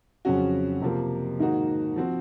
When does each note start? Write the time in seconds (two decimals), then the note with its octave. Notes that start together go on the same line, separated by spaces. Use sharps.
0.25 F2 C#3 F#3 C#4 F#4
0.82 F2 C3 F3 A#3
1.39 G#2 D#3 A#3 D#4 F#4
1.96 F3 C4 F#4